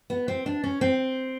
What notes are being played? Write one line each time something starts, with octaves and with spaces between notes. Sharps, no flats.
B3
C4
D4
C#4
C4